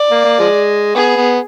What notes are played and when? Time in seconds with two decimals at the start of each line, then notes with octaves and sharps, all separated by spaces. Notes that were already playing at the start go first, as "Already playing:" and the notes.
Already playing: D5
0.11 A#3
0.24 A#3
0.39 F3 G#3
0.95 B3 G#4
1.16 B3